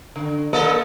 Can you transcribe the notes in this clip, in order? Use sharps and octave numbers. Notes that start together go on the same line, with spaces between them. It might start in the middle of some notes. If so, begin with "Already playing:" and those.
D3
A#3 A4 D#5